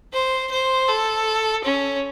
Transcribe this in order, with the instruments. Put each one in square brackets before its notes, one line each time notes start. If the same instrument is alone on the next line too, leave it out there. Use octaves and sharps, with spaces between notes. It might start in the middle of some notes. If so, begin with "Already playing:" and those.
[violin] C5
C5
A4
C#4